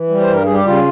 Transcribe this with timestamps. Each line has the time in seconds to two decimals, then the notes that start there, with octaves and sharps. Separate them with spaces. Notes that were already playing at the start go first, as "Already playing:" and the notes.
Already playing: E3
0.09 G3
0.20 C5
0.28 G2 A#4
0.43 G3 G#4
0.54 G4
0.65 C#3 F4